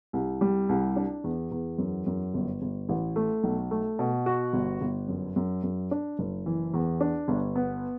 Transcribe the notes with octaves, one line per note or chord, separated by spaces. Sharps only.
C2
G3
C2
D4
E2
E2
F#2
F#2
G1
G1
A1
A3
B1
A3
B2
F#4
G1
G1
F#2
F#2
F#2
D4
F#1
E3
E2
D4
G1
B3